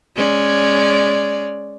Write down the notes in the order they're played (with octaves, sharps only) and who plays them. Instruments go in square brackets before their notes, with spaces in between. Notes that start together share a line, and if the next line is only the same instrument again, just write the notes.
[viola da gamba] G#3 C#4 D5